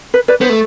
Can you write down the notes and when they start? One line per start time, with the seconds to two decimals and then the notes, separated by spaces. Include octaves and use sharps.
0.14 B4
0.28 B4 D5
0.41 B3 C5
0.50 A3